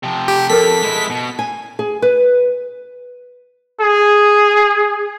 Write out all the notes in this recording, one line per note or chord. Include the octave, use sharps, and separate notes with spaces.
C3 F3
G4
F2 A4 A#4 B6
G#3 E4
B2
G#5
G#4
B4
G#4